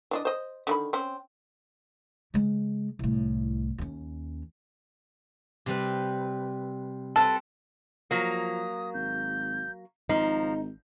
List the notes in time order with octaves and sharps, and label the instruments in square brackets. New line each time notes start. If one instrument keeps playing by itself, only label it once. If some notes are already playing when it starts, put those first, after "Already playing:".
[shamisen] E3 D4 D#5
C5 D#5
D3 D#3 B5
C4 C#4
[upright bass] C#3 G#3
C2 A2
D#2 C#4
[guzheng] C3 G3 B4
[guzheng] C4 B4 [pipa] A4
[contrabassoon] F3 [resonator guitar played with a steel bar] F#3 A#3 [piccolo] D#6
[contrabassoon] G#1 [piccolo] G6
[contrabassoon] G#1 [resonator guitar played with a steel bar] F3 [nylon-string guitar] D#4 [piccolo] A#5